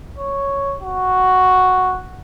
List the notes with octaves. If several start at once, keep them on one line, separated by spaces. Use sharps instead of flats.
C#5
F#4